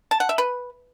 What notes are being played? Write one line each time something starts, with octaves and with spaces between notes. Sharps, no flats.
A5
F#5
E5
B4